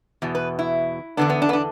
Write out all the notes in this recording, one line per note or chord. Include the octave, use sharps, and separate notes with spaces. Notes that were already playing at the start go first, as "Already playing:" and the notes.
E2 B2
B4
E4
E2 D3 B3 D4
B3
D4
B3
D4